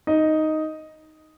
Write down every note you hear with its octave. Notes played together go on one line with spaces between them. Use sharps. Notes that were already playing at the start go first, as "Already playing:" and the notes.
D#4 D#5